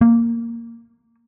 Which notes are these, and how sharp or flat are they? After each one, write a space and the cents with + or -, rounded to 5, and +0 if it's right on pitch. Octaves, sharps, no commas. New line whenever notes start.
A#3 -10